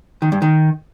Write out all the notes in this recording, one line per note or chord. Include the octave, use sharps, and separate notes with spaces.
D#3
G2
D#3